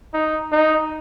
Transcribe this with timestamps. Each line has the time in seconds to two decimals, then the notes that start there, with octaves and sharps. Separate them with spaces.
0.14 D#4
0.52 D#4